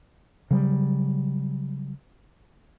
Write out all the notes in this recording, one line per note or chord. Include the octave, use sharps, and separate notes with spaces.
C#3 F#3 G3